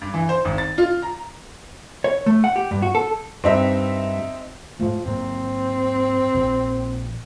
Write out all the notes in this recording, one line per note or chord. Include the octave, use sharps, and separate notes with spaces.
G2
E3
C5
G#1
A6
F4
A#5
C#5
A3
F#5
G4
G2
F#4
A4
G2 C4 D#4 E5
G#2 F3 A3
G#2 F#3 A#3 C4
A#1